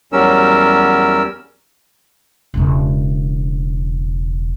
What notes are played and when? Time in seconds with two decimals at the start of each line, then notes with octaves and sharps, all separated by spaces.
0.12 E2 F#3 G3 C#4 A#4 E6
2.54 E1 C#3